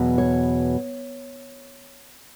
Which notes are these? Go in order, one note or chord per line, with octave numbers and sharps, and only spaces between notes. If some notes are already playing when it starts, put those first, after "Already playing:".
Already playing: E2 B2 F#3
C#5